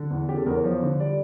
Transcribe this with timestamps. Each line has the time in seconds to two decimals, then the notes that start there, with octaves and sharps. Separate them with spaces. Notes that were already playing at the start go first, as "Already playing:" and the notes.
Already playing: D3
0.10 E2
0.28 C#3 G4
0.37 A4
0.46 E2 A#4
0.55 C#5
0.64 F3
0.82 D3
1.00 G3 D5